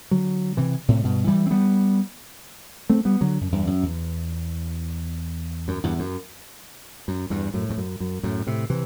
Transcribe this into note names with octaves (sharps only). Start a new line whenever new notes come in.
D3 F#3
C3 E3
A2 C3
G2 B2
E3 G3
C4
G3 B3
A3 C4
G3 B3
D3 F#3
F#2
E2 G2
F#2
E2
F#2
E2 G2
F#2
F#2
E2 G2
F#2 A2
E2
F#2
F#2
F#2 A2
A2 C3
C3 E3